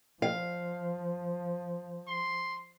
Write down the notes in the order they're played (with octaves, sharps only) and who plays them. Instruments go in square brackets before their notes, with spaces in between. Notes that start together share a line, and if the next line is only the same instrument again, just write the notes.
[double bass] F3 [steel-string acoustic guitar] F5
[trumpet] C6